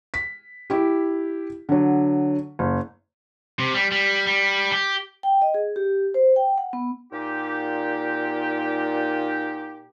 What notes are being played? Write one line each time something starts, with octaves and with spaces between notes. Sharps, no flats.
B6
E4 G4
D3 F#3
F#1
C3
G3
G3
G3
G4
G5
D#5
G#4
G4
C5
G5
F#5
B3
A#2 D#4 G4